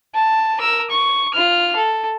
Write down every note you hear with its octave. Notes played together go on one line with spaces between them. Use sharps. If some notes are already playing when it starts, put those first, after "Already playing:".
A5
A#4 E6
C#6
F4 F6
A4